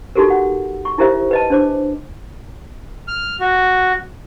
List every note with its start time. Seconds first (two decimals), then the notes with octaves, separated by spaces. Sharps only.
0.16 D#4 F#4 G4 A4 A#4
0.30 F#5
0.85 C#6
0.98 D#4 E4 G4 A#4 C5 E5
1.31 B4 D#5 A5
1.50 D4 C5 D6
3.08 F6
3.40 F#4